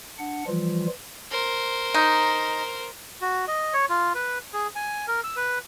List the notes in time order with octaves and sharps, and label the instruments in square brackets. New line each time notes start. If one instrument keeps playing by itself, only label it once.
[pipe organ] D4 F#5
E3 F3 G3 F4
[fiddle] A#4 C5
[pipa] D#4
[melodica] F#4
D#5
C#5
F4
B4
G#4
G#5
A#4
E6
B4